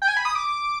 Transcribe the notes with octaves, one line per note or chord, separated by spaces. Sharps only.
G5
G#5
B5
D#6
D6